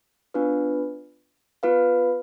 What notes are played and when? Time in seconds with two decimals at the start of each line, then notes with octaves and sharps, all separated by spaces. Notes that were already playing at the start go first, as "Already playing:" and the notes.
0.34 B3 D4 F4 B4
1.63 B3 F4 B4 F5